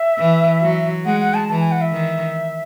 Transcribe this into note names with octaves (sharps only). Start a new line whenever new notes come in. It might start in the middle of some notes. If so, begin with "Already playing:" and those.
Already playing: E5
E3
F#3
G#3 F#5
F#5
A5
E3 A5
G#5
F#5
E5
D#3